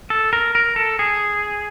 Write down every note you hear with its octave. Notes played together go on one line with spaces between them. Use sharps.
A4
A#4
A#4
A4
G#4